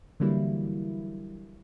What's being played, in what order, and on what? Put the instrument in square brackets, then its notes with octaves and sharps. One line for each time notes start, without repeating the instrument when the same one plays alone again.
[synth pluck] D3 E3 F#3 G3 A#3 E4